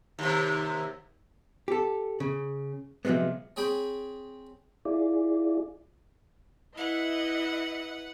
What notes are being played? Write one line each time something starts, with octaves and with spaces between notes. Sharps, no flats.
D#2 C3
G4 A4
C#3
C3 F3 F#3 G#3 B3
C4 G#4 C#5 G5 B5
E4 F4 G#4 D5
E4 B4 D#5 E5 F#5